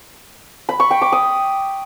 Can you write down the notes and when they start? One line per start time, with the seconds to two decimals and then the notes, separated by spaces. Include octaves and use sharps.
0.69 B5
0.80 C#6
0.91 G5
1.02 D6
1.12 D#6